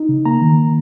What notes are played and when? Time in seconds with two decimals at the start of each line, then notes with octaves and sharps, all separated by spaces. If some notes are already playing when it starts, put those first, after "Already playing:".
Already playing: D#4
0.09 C#3
0.25 A#3 A#5
0.42 D#3